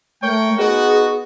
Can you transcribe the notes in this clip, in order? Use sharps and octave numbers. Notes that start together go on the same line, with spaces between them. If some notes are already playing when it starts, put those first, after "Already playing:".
A3 A#4 C#5 G5
B3 D#4 F#4 G#4